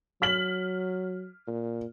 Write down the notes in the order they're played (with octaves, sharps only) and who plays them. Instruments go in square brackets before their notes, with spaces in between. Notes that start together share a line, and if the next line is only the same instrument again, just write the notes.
[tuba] F#3 [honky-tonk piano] F6 B6 F#7
[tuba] A#2